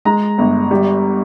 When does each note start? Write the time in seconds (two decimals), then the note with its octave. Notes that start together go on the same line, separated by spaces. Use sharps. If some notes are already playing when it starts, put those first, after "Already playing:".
0.05 G#3 A#5
0.38 G1
0.71 G3